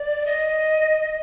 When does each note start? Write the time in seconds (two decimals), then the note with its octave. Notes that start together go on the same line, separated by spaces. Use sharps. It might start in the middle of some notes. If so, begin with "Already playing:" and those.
Already playing: D5
0.26 D#5